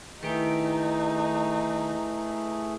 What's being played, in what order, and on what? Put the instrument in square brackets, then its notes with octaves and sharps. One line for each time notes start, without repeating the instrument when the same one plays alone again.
[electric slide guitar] D#3 G4 [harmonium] A3 G#4 [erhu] D#4 [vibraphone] E4 B4